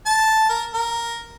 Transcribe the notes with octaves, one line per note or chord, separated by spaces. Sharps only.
A5
A#4
A#4